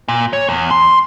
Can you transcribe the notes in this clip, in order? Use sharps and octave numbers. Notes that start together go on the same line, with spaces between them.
A#2
C#5
E2
C6